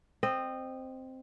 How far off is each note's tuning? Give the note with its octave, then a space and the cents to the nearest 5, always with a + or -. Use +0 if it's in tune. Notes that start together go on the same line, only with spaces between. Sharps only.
C4 +0 D#5 -20